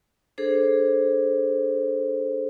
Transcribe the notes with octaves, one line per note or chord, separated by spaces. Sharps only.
D4 G#4 A4 C5